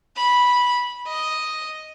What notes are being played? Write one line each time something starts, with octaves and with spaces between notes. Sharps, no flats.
B5
D#5